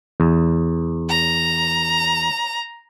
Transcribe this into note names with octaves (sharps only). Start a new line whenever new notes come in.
E2
A#5